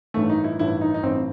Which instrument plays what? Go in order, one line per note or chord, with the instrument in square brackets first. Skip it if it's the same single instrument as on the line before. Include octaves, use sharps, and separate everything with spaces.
[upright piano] A1 G2 D#3 A3
D#4
E4
A1 G2 D#3 E4
D#4
D#4
A1 G2 D#3 C4